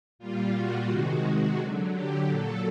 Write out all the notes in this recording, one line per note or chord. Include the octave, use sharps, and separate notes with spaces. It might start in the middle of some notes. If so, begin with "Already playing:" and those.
A#2 G3 F4
F#4
C3 D#3 G#3 F#4
D3 F#3
G4
A#2 F#3 A4